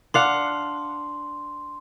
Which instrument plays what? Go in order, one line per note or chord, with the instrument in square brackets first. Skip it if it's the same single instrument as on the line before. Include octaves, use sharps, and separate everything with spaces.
[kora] D4 F5 F#5 [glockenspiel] C6